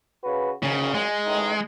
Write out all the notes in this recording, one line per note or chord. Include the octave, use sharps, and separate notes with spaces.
C#3 F#4 B4
G#1 A#2 C#3 F#3
G#3
A1 D#3 D#4